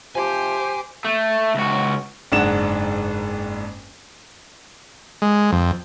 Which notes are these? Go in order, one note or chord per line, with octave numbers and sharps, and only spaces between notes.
C3 F3 G4 C5 G#5
A3
C#2 F#4
F#1 G#2 D4 F#5 E7
G#3
F2